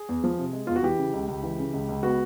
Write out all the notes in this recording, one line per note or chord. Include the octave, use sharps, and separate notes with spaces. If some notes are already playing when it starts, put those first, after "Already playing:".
Already playing: G#4
E2
F3
C3
G#3
E2 F4
F#4
E3 G4
C#3
C#2
C#2
E3
C#3
C#2
C#2
B3 F#4